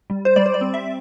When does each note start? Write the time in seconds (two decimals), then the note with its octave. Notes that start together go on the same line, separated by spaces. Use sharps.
0.10 G3
0.25 C5
0.36 G3 D5
0.46 C5
0.54 D5
0.61 C4
0.74 E5